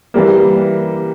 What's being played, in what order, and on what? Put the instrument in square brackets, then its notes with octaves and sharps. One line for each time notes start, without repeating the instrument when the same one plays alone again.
[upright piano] E3 G3 A#3